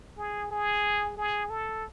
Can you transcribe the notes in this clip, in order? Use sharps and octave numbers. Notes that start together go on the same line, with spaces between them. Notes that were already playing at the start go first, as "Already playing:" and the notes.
G#4
G#4
G#4
A4